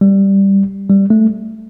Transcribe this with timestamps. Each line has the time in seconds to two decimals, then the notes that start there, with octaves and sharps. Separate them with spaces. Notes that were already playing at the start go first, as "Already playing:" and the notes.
0.01 G3
0.89 G3
1.10 A3